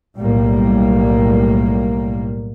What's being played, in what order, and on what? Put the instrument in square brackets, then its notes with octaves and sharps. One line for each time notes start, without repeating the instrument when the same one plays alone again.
[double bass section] B1 A2 G3 A#3